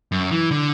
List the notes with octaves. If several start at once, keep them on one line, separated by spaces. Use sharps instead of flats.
F#2
E3
D3